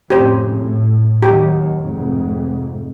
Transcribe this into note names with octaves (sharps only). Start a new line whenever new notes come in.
F2 A2 C#3 G4 C5
A2
D#2 D#3 F#3 G4
F1 G#2